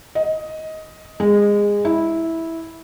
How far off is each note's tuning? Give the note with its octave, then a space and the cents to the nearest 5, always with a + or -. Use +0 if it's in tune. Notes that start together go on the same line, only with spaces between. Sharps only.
D#5 +15
G#3 -20
E4 -10